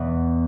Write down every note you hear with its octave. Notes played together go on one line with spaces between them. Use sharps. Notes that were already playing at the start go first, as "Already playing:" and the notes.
Already playing: E2 B2